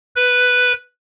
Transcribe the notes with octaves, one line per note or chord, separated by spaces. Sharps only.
B4